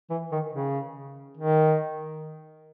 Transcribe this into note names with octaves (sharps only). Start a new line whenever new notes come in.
E3
D#3
C#3
D#3